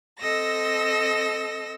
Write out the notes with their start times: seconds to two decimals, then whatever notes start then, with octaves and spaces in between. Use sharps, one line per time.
0.19 C4 A4 D#5 E6 A#6